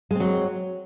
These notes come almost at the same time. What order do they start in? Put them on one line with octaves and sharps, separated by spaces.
G#3 C4 F#3